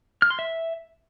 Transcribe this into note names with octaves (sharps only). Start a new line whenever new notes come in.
F6
C6
E5